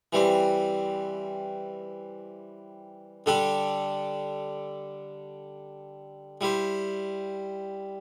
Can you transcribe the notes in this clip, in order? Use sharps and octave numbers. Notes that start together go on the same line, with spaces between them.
E3 G3 C4
D3 G3 D4 A4
G3 E4 C5